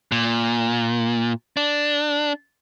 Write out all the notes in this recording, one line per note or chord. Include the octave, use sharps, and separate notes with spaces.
A#2
D4